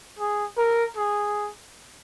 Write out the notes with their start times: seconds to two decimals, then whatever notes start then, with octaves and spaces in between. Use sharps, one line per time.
0.19 G#4
0.58 A#4
0.96 G#4